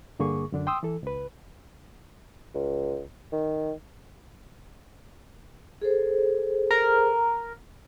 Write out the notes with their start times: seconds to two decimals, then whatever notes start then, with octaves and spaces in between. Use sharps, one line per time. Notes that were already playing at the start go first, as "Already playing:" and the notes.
0.19 G2 D3 A#3 G#4 C#6
0.52 F#2 D3 D4
0.67 G5 C6 D#6 E6
0.83 E3 A4
1.03 C#2 B4
2.55 C#2
3.32 D#3
5.82 G#4 A4 C5
6.71 A#4